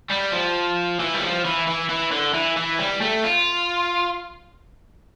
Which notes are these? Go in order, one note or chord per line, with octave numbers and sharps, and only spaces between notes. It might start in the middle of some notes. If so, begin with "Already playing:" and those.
G3
F3
E3
G3
F3
E3
E3
E3
D3
E3
E3
G3
A3
F4